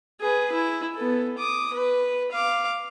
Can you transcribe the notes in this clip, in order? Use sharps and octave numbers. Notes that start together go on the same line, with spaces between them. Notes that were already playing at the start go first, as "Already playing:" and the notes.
G#4 B4
E4
B3 A4
D6 D#6
B4
F5 D6